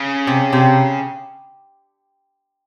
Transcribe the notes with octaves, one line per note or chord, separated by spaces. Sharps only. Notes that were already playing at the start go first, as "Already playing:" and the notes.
Already playing: C#3
C3
C3